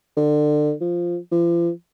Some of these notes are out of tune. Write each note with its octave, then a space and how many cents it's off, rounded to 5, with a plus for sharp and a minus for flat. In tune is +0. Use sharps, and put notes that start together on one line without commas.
D3 +30
F3 -5
F3 -40